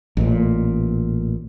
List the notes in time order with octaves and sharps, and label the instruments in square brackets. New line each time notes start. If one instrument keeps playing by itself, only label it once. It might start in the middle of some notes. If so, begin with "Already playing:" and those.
[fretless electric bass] A1 A#2